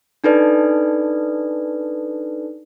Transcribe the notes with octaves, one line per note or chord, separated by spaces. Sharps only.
D4 D#4 A4 B4 D5